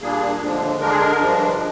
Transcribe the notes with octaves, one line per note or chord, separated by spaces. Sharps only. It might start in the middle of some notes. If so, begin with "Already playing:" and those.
A#2 G3 A#3 D4 G#4
D#2 D3 F3 G#3 D4
D3 G#3 D4 A#4
G#4
A#4
G2 F3 G#3 D4